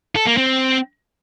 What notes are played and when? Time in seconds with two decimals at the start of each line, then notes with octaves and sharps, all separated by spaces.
0.16 A4
0.27 A#3
0.37 C4